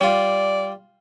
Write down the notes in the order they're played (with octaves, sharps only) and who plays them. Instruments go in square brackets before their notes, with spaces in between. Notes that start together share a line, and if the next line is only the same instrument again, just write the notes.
[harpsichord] G3 F4 [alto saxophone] D5